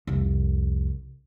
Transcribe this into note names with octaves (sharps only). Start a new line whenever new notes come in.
C2 F2